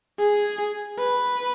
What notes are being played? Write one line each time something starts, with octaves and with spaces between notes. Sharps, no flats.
G#4
B4